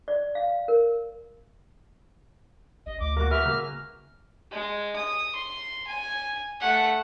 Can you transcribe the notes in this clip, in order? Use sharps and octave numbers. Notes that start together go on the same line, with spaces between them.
D5
F5
A#4
A1 D#5
D2 D6
A#3 F#4
C#4 B4 E5 F6
C#3 A#3
G#3
D#6
C6
G#5
A3 F#5